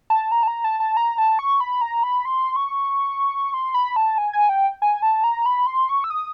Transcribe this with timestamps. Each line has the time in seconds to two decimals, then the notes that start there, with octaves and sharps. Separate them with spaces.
0.10 A5
0.32 A#5
0.43 A5
0.48 A#5
0.64 A5
0.80 A5
0.97 A#5
1.18 A5
1.39 C#6
1.60 B5
1.81 A#5
2.03 B5
2.25 C6
2.56 C#6
3.54 C6
3.74 B5
3.96 A5
4.18 G#5
4.33 G#5
4.49 G5
4.82 G#5
5.02 A5
5.24 A#5
5.46 B5
5.67 C6
5.89 C#6
6.04 E6
6.10 D#6